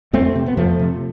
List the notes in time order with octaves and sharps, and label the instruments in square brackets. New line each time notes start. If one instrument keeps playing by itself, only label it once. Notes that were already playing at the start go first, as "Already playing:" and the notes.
[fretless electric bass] F2 A3 C4
C3
B3
F2 F3 A3
C3